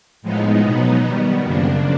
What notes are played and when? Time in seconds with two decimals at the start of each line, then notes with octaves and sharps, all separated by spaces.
0.22 A2 F3 G#3 B3 D#4
0.63 B2 F#3 B3 D#4
1.04 D#3 G3 B3
1.44 F#2 C#3 F3 A#3 D4